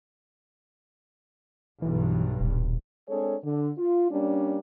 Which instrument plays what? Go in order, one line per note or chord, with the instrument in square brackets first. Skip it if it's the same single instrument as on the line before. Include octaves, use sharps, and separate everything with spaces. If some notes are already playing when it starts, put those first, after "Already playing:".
[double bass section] B1 G2 [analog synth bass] E3
[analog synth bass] D#1
[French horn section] G#3 C4 D4 G#4 A4 C#5
D3
F4
G3 A#3 C#4 D4